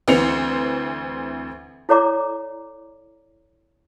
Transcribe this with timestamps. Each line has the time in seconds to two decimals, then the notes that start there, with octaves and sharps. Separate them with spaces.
0.08 D2 E3 C4 C#7 F7
1.89 E4 A4 C#5 D5 A#5 D6